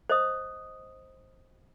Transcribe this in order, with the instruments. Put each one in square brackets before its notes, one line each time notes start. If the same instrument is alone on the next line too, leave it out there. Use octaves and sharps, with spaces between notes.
[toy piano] C5 D#5 D#6